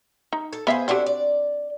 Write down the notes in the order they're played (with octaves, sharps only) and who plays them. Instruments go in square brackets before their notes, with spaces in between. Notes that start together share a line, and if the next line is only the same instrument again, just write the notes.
[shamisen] D#4
[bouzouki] A4
[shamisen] B3 E5 F5 [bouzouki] G#4 C5
[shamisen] C4 F#4 G4 [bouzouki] D4 E4 A4
[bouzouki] D5